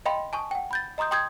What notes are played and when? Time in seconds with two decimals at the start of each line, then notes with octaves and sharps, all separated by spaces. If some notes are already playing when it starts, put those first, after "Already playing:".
0.06 D#5 F5 G5 B5 C6
0.33 G#5 A5 C#6 D#6
0.51 F#5 G5
0.71 B5 G6 A6
0.98 D#5 A#5 C6 D#6 G6
1.11 G5 C6 D#6 G6 G#6